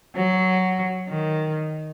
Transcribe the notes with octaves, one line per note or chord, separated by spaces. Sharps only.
F#3
D#3